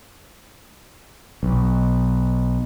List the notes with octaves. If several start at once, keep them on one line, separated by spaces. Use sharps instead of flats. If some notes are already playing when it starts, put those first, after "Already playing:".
B1